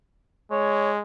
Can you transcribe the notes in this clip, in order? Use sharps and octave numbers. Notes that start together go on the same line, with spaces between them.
G#3 C#5